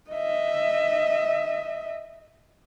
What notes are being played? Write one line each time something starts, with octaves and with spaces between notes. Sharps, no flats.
D#5 E5